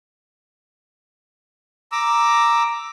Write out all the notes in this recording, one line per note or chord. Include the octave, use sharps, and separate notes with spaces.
A#5 D6 E6